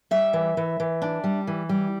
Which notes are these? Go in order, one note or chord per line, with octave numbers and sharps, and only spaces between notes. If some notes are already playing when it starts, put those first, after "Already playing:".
G3 E5
E3
E3
E3
D4
G3
E3
G3